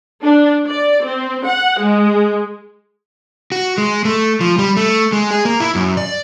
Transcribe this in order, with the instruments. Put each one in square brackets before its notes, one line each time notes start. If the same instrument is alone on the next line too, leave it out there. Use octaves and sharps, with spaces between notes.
[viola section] D4
D5
C4
F#5
G#3
[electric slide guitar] F#4
G#3
A3
F3
G3
A3
G#3
G#4
A#3
E4
F#2
D5